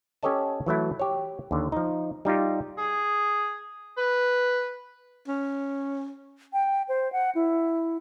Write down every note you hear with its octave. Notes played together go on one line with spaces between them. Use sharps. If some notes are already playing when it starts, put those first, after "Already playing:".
C#4 G4 A4 C#5 D#5 A5
E3 F#3 A3 E4
G4 C#5
D#2 D3
F3 D#4
G3 D#4 F4 G4
G#4
B4
C#4
G5
C5
F#5
E4